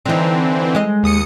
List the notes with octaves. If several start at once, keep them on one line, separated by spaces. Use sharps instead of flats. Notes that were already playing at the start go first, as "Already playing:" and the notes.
D3 E3 C4 D#4
G#3 D#5
D#2 D#6 C#7